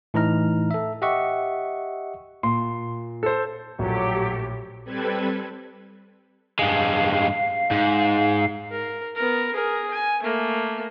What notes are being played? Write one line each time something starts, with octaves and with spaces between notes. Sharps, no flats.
A2 E3 D#4 A#5 F6
A4 E5
G4 D#5 E5 F#5 C#6
A#2 C6
A4 C5
A#1 A2 F3 F#3 G4 A4 C#5
G3 C4 A4 B4 G#6
G2 G#3 F5
G#2
A#4
B3 A#4
G#4 A#4
G#5
A3 A#3